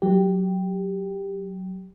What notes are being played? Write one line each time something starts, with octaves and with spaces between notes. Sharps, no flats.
F#3 G4